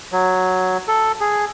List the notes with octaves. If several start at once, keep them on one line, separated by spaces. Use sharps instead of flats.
F#3
A4
G#4